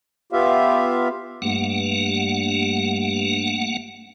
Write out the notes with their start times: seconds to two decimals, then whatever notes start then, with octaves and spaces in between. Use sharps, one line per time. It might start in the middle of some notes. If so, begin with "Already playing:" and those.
0.32 B3 F4 G4 E5 F5
1.42 G2 A3 A#3 F#5